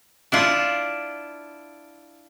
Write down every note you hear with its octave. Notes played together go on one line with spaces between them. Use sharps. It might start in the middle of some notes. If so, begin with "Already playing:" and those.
D4 E4 F4